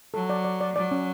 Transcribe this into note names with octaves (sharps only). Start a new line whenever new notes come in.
F#3 A4
D5
D5
D5
F#3 D5
C#4